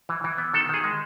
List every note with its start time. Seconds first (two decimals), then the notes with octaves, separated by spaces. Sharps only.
0.09 E3
0.24 E3
0.38 B3
0.54 D#3 A4
0.69 D#3 G#4
0.84 G#3